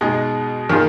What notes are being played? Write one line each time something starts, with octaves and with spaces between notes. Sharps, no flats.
B2 G#3 D#4 G#4
D#3 A#3 F4 G#4